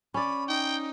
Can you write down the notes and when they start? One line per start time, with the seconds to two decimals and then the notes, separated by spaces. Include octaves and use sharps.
0.14 C#4 D5 B5
0.48 D#4 G5